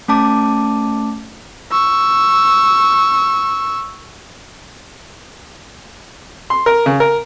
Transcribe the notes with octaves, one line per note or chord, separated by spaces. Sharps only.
A3 C#4 A5 D6
C#6 E6
C6
A#4
C#3
A#4